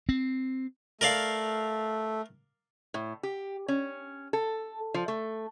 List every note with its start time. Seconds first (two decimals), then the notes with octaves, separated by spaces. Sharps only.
0.09 C4
1.01 A3 A#4 D5 F5
2.94 A2
3.23 G4
3.68 C#4
4.33 A4
4.94 F3
5.08 A3